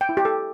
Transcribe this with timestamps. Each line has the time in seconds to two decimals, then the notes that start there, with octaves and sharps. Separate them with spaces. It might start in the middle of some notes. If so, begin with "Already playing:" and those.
0.01 G5
0.09 E4
0.17 G4
0.25 A4